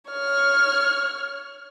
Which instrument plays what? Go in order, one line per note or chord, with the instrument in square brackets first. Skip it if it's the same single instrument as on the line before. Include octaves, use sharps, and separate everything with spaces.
[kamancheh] C#5 F6